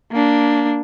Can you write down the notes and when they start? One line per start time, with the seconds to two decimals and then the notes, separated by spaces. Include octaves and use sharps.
0.12 A#3 D4